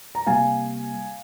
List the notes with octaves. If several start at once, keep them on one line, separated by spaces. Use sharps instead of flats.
A#5
C3 G3 A#3 F5 G#5